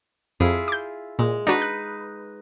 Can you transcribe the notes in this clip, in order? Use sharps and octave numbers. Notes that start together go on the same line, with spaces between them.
F2 E4 F4 G#4
D6 G6
A#2 G#3
D4 D#4 F#4 B4
F#6